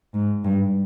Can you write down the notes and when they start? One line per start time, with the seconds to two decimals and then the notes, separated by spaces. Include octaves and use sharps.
0.14 G#2
0.44 G2